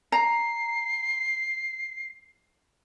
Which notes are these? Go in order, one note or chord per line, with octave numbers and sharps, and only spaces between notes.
A#5 C7